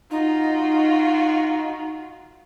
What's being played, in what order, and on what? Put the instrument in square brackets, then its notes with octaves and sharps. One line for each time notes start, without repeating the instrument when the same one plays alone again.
[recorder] D#4 [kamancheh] F4 F#4